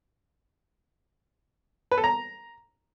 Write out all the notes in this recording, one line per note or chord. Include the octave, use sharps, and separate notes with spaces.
B4
A4
A#5